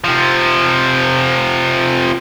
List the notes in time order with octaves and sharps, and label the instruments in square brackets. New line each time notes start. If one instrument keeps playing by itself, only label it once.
[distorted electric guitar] C3 F3